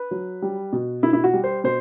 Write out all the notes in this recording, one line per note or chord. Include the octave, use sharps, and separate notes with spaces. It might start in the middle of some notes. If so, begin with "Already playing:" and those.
Already playing: B4
F#3
G3
B2
B2 E4
E4
F#4
G3
C5
B2 C5